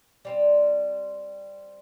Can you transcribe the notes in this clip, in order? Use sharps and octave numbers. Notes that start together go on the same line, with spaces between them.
G3 C4